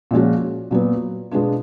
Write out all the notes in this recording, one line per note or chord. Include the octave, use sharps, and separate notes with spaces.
A#2 F3 G#3 C#4 F#4
A#2 F#3 B3
B2 G#3 B3 D4 F4